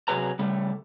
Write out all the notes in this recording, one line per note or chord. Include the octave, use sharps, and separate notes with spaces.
C3 E3 F#3 G#4 B4 A#5
C#3 G3 A3